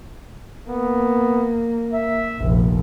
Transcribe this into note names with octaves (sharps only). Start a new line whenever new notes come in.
A#3 B3
E5
F1 A#1